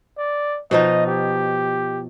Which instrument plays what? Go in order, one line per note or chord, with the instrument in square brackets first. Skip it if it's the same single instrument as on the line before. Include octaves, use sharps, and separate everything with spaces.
[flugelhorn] D5
[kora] B2 F3 D#4 [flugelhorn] D#5
[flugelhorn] G4